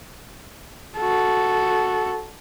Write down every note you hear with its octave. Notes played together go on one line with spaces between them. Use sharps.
F#4 A4